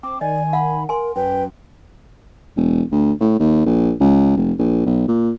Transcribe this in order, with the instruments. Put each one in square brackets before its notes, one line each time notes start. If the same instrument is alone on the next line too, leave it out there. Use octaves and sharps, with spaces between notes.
[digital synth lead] C4 [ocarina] D6
[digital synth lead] D#3 [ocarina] D5 [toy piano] D#5 [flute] G#5
[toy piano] F5 F#5 [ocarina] B5
[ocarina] A#4 [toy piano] G#5 C6
[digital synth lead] F#2 [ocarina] B4 [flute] G5
[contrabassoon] E1
D2
A2
D#2
A#1
C#2
F1
A#1
B1
A#2